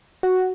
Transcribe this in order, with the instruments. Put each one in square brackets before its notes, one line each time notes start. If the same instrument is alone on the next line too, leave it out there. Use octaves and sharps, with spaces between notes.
[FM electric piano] F#4